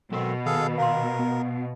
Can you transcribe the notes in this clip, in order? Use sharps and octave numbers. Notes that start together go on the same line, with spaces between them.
B2 F#3 C4 A4 A#4
D#3 G#4 A4 F5
A#4 F5 C6
B3